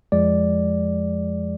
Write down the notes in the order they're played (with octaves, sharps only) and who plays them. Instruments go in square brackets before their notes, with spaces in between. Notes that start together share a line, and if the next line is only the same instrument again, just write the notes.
[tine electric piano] F2 F3 G#3 D5